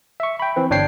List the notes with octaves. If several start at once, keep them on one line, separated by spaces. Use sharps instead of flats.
E5 C#6
G5 B5
E3 C4 B4
G1 D4 C#5 G5 C7